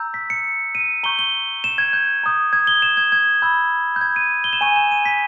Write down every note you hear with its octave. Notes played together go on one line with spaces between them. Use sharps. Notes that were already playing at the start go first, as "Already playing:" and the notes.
Already playing: A#5 E6 G6
B6
C#7
D#7
A#5 C#6 G6 G7
G7
E7
G#6
G6
A#5 D#6 G6
G#6
G7
E7
G#6
G#6
B5 E6 G6
G6
G#6
D#7
G7
E7
G#5 C#6 G6 D#7
E7
D#7
B6